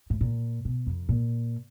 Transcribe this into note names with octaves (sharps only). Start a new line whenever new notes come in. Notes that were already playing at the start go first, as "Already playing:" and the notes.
A2
A#2
B2
F2
A#2